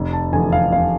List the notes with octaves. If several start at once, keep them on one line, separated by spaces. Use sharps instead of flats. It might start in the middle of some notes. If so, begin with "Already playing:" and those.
Already playing: F1
A5
E2 D3 F3 A3 G#5
F5
F1 F5